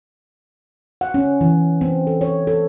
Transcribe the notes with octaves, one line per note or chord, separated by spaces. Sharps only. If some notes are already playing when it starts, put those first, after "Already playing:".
F#5
C#4
E3
C4
A4
C#5
A4